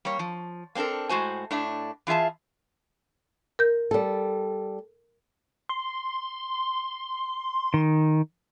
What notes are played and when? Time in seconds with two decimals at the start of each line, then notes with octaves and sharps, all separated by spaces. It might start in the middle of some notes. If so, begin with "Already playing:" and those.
0.05 G3 A#3 C#5
0.19 F3
0.75 A#3 C4 D4 A4 A#4
1.09 A2 G#3 F#4 C5 G#5
1.51 A2 D4 E5
2.07 E3 F4 G#4 E5 A5
3.59 A#4 G6
3.91 G3 A4
5.69 C6
7.74 D#3